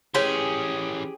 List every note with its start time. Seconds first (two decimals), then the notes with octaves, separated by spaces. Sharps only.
0.14 E3 C#4 G4 G#4 B4 C#5 C6